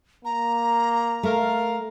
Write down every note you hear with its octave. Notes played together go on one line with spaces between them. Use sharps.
A#3 A#5
A3 A#4 F5